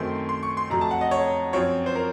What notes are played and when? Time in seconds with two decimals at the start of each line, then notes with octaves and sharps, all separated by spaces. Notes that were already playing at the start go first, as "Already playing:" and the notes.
Already playing: F#2 D#3 A3 C4 C6
0.29 C6
0.43 C#6
0.57 C6
0.70 F2 C3 F#3 A3 A#5
0.81 A5
0.91 F#5
1.01 D#5
1.11 C#5
1.53 F#2 F3 C4 C#5
1.86 C5
1.95 A#4